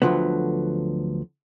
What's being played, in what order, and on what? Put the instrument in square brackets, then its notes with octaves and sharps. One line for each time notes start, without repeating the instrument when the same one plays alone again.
[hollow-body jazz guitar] D2 A#2 D3 F3 F#3 B3